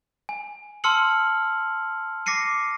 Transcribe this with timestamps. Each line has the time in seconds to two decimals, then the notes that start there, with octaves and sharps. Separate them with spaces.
0.29 G#5
0.84 A5 C6 E6 F6 C#7 F#7
2.26 D6 A#6 C7 C#7 D#7